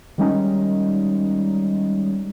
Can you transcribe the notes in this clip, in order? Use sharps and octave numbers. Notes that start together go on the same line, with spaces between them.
D#3 G3 G#3 C#4 D#4